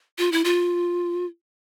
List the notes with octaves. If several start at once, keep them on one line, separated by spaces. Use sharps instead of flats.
F4
E4
F4